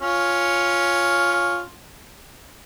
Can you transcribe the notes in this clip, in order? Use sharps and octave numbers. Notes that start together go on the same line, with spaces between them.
C#4 F4 F6